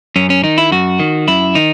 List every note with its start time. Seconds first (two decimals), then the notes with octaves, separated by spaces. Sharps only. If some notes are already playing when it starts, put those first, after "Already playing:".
0.16 F#2 C#4
0.30 C#4
0.43 D#3 D#4
0.58 E4
0.71 F#2 F#4
1.00 D#3
1.28 F#2 E4
1.55 D#3 D#4